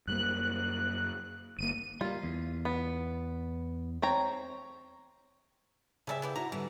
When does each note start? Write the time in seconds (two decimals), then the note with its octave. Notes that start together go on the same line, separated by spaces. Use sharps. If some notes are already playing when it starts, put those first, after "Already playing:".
0.07 F#2 G3 A#3 F#6
1.59 G1 A#3 D#7
2.01 G3 A#3 F4
2.23 E2
2.65 B3
4.02 C4 C#5 A#5
6.07 C#3 G3 A4 D5 E5
6.22 B3 E4 G4
6.36 D4 E4 F#4 A#5
6.52 D3 E3 G3